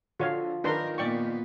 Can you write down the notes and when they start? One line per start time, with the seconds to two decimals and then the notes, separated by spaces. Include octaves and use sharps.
0.20 D3 F3 F#4 C#5 F5
0.64 D#3 D4 G#4 A#4 B4 C6
0.98 A#2 B3 D5 G5 C#6